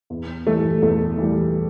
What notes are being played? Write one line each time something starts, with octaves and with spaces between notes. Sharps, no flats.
E2
E3 G3 A3
E2 A3
E3 G3